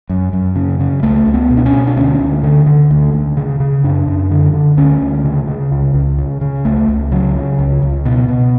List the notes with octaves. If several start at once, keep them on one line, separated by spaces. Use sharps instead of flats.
F#2
F#2
C#3
C#3
C#2 A3
C#2
B3
B2
D4
C#4
B2
D4
D2 C#4
D2
D3
D3
D2
D2
C#3
C#3
F#2 D4
F#2
D3
D3
D2 C#4
D2
C#3
C#3
C#2
C#2
C#3
C#3
C#2 A3
C#2
C#3 F#3
C#3
C#2
C#2
B2
B2